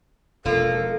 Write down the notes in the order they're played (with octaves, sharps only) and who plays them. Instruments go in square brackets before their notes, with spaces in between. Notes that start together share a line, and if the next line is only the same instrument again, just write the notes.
[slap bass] E1 [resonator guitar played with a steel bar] F3 A#3 F4 [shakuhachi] A4 [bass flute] A#4